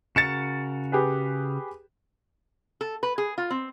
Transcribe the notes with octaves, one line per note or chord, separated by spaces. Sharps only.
C#3 F#4 A#4 A6 C#7 E7
G4 G#4 B4
A4
B4
G#4
F4
C4